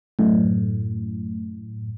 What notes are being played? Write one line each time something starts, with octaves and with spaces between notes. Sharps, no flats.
F#2 A2